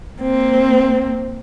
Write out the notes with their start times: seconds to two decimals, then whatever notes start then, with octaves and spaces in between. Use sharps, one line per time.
0.18 A#3 C4